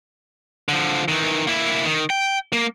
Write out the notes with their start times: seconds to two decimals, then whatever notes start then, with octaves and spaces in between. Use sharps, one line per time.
0.69 D3 F3
1.08 D#3 E3
1.47 A#3 E4
1.85 D#3
2.10 G5
2.53 A#3